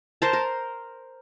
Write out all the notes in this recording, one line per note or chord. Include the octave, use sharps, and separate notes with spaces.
A#4 C5 A5
A#4